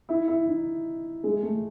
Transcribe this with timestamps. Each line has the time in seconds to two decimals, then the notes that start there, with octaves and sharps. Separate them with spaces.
0.09 E4
0.28 E4
0.48 D#4
1.24 G#3
1.43 A3